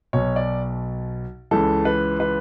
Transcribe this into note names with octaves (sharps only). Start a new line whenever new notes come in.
B1 B2 C#5
D5
C#2 C#3 E3 A4
B4
B4